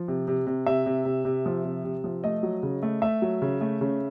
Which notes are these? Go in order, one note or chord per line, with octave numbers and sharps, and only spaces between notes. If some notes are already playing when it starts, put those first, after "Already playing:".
Already playing: F3
C3
C3
C3
C3 E5
C3
C3
C3
F3
C3
C3
F3
A3 D#5
F#3
C#3
A3
A3 E5
F#3
C#3
A3
C#3